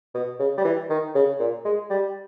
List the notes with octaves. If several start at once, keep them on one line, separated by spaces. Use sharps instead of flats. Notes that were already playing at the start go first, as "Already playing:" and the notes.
B2
C#3
G3
E3
D#3
C#3
A#2
G#3
G3